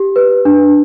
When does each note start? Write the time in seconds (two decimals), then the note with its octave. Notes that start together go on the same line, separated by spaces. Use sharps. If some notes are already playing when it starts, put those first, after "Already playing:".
Already playing: G4
0.16 B4
0.45 D4